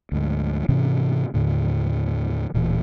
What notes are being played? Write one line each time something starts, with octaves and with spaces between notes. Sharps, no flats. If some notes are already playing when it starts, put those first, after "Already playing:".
D2 G#2
G#2 C3 E3 C#4
D#2 A2 D3
D1 A#2 E3